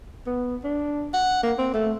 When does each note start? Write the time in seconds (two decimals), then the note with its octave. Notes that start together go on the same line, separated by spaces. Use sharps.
0.26 B3
0.64 D4
1.13 F#5
1.43 A#3
1.58 C4
1.74 A3